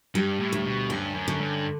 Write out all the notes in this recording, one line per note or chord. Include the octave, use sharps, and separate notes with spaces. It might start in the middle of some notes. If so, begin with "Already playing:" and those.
G2 G3
A2
D2
B2
G2 C#4
F#2
D3
G2